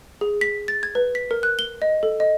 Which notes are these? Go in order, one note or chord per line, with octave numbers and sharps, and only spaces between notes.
G#4
B6
A6
G#6
B4
B6
A#4
F#6
G7
D#5
A4
D#5